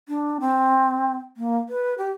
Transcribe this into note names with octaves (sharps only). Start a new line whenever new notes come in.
D4
C4
A#3
B4
G4